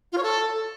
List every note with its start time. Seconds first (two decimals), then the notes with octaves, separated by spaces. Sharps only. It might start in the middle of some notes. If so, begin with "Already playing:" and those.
0.12 F4
0.18 C#5
0.23 A4